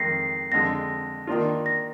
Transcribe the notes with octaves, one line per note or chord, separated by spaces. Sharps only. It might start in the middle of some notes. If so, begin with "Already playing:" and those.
Already playing: F2 D#3 G#3 A#6 C7
F2 D3 G#3 A#6
D#3 A#3 D4 F4
A#6